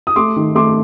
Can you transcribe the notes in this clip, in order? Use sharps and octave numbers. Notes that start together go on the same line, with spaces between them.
D#6
A3 C6 D6
D#3
A3 C6 D6